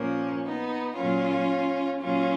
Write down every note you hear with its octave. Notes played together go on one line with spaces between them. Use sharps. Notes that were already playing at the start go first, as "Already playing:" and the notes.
Already playing: A#2 F3 A#3 C#4
B3 D#4
A#2 F#3 A#3 C#4 F4
A#2 F#3 A#3 C#4 F4